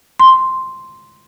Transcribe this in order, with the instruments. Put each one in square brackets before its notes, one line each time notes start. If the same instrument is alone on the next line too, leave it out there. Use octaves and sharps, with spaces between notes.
[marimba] C6